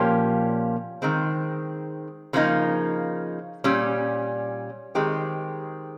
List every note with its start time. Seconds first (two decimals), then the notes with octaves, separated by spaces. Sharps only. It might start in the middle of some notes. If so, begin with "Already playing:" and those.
Already playing: A#2 F3 A#3 C#4 G4
1.02 D#3 G#3 C4
2.33 C#3 F3 A#3 D#4
3.64 A#2 G3 C#4
4.95 D#3 G#3 C4 G4